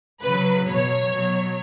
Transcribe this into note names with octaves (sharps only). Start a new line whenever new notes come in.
C#3 F#3 B4
B2 F#3 C#5
B2 F#3